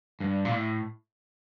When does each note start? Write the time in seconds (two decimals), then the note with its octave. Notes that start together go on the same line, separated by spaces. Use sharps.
0.20 G2
0.45 A#2
0.51 A2